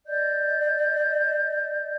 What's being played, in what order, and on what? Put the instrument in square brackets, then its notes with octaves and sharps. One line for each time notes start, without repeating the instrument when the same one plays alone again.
[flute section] D5 D#5 G6